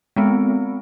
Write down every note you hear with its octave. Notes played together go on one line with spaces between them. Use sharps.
G#3 B3 C4